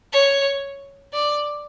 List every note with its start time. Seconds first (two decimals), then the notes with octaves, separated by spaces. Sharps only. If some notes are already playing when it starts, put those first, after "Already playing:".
0.13 C#5
1.14 D5